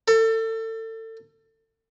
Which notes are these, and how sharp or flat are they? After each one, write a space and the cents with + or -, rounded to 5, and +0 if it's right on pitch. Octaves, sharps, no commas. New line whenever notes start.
A4 +30